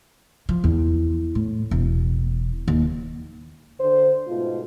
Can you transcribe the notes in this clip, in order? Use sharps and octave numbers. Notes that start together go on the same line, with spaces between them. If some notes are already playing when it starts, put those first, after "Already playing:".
F3
E2
A2
E1
D#2
D3 C5
G#2 B2 A3 F4